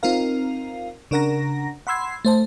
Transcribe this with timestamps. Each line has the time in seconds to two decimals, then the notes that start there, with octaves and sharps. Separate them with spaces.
0.03 C4 D#4 F4 A#4 F5
1.11 C#3 D4 A#4 F#5 A#5 A#6
1.87 F#5 B5 C6 E6 G#6 C7
2.25 A3 C5 A5